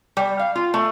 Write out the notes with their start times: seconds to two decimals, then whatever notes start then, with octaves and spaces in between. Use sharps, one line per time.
0.17 G3
0.39 F5
0.55 F4
0.74 A3